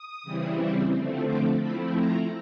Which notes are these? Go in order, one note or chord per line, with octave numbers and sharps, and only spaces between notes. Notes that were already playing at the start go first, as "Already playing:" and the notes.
Already playing: D#6
C#3 E3 G3 C4 E4
D3 F3 A3 C4
D6
F3 A3 C4 E4 B5
A#5